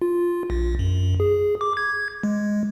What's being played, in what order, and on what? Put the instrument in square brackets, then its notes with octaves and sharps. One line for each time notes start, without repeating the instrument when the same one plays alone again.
[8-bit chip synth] F4
A#1
F#2
G#4
D6
G#6
G#3